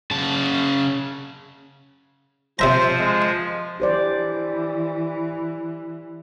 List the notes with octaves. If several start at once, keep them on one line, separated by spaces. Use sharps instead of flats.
C#3 A5
C3 F3 C5 E5 A#5
G#3
E3 G4 C5 D5